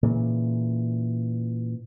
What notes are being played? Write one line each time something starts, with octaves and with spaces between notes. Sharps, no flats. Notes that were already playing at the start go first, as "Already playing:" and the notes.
A#2 C#3 E3